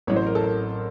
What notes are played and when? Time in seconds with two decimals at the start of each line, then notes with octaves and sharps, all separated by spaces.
0.07 A1 A2 F#3 C#5
0.16 C5
0.26 A#4
0.35 A4
0.44 A#4